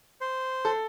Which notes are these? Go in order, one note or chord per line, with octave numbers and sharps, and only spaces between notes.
C5
A4